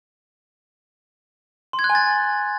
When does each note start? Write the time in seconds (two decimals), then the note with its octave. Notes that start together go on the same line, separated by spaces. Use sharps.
1.73 C6
1.79 G#6
1.84 F#6
1.90 G#5
1.95 A6